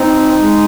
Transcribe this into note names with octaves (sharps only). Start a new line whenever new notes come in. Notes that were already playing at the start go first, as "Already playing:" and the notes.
Already playing: C4 D#4
G#3